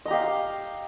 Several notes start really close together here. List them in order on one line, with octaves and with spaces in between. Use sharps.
D#5 A#5 G4 F5